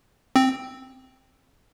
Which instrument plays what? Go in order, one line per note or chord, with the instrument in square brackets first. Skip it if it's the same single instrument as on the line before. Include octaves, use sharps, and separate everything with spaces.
[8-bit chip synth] C4